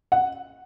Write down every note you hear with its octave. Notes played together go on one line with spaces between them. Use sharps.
F#5